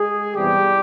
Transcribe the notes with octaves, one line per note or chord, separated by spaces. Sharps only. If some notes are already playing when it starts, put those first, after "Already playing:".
Already playing: G#3 G#4
E2 C3 E3 G3 G4